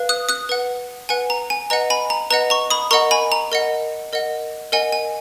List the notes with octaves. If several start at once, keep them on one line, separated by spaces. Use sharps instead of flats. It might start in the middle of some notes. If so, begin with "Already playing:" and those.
Already playing: B4 F5
D#6 F#6
D#6 F#6
B4 F#5
B4 F#5 G#5
A#5
G#5
B4 D#5 F#5 A#5
G#5 B5
A#5
B4 D#5 F#5 A#5
A#5 C#6
B5 D#6
A#4 D#5 F#5 A#5 C#6
G#5 B5
A#5
A#4 D#5 F#5
A#4 D#5 F#5
A#4 D#5 F#5 G#5
G#5